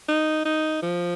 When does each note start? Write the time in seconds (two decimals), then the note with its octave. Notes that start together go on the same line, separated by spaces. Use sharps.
0.08 D#4
0.45 D#4
0.82 F3